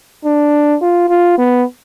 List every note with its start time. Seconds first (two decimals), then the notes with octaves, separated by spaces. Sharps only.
0.25 D4
0.82 F4
1.09 F4
1.38 B3